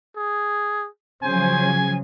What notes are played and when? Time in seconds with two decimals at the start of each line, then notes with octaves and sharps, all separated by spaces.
0.16 G#4
1.23 C#3 F3 F#3 C5 G#5